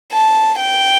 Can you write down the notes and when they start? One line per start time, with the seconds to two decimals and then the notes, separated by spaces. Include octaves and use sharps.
0.12 A5
0.60 G5